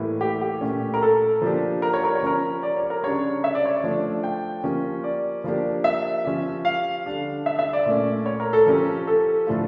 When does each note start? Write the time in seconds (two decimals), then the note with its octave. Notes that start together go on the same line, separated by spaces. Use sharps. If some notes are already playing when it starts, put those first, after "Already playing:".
Already playing: A2 E3 G3 A#3 E4
0.21 G4
0.41 G4
0.61 A#2 A3 C#4
0.94 A#4
1.02 A4
1.42 F3 A#3 D4 G4
1.82 A#4
1.93 C#5
2.04 A#4
2.15 C#5
2.23 F3 C#4 G4 A#4
2.63 D5
2.77 C#5
2.90 A#4
3.03 C#3 G3 D4 C#5
3.44 E5
3.55 D5
3.65 C#5
3.76 D5
3.84 F3 A3 D4
4.24 G5
4.64 F3 A#3 C#4 G4
5.04 D5
5.44 F3 A#3 D4 G4
5.84 E5
6.25 F3 C#4 G4
6.65 F5
7.06 D3 G3 D4
7.46 E5
7.59 E5
7.73 D5
7.86 A#2 A3 C#4
8.26 C#5
8.40 A#4
8.53 A4
8.66 F3 C#4 G4 A#4
9.07 A4
9.47 A2 F3 A3 D4 F4